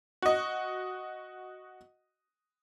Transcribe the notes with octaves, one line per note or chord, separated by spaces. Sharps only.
F#4 D#5